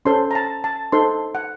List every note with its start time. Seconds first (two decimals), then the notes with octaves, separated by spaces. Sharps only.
0.05 C#4 A4 C5 C6
0.31 A#5
0.35 A5
0.64 A5
0.92 D#4 A4 C5 C6
1.35 F#5